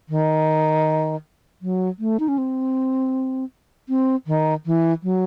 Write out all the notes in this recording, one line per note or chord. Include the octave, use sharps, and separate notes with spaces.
D#3
F#3
A3
D#4
C#4
C4
C4
D#3
E3
F#3